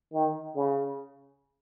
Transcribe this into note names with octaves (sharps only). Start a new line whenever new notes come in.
D#3
C#3